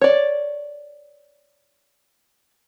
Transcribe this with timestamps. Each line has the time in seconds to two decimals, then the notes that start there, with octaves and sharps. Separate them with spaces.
0.01 C#5 D5